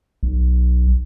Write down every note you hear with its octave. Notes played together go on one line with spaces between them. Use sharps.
B1